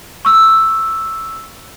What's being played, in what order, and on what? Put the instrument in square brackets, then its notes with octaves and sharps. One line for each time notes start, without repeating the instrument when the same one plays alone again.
[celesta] C#6 E6